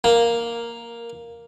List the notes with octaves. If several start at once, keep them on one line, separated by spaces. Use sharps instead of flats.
A#3